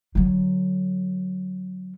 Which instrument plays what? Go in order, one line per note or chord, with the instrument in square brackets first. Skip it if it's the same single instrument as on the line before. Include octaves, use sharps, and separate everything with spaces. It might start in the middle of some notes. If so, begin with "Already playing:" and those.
[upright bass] D3 F#3